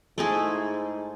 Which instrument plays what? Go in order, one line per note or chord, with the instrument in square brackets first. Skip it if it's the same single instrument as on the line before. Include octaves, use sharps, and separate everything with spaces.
[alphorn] G#2 [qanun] A3 E4 G#4